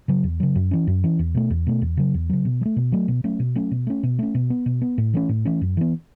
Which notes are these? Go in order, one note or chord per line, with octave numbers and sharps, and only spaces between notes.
C#3 F#3
E2
C#3 F#3
F#2
E3 C#4
F#2
E3 C#4
E2
B2 A3
E2
B2 A3
E2
C#3 F#3
E2
C#3 F#3
B2
F#3
A3
B2
F#3 A3
B2
F#3 A3 C#4
B2
F#3 A3 C#4
B2
A3 C#4
B2
A3 C#4
B2
B3
B2
B3
A2
E3 A3 C#4
A2
E3 A3 C#4
F#2
E3 B3